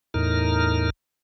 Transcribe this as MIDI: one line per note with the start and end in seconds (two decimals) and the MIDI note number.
0.14 0.90 40
0.14 0.90 45
0.14 0.90 63
0.14 0.90 70
0.14 0.90 89